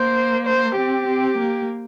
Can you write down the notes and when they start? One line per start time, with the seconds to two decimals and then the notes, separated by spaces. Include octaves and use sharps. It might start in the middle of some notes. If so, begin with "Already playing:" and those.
Already playing: A#3 C5
0.46 C5
0.77 C4 G4
1.07 C4
1.38 A#3